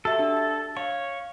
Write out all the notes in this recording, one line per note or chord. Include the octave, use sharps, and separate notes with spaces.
F#4 G4 A4 E5
D4
A6
C#5 F5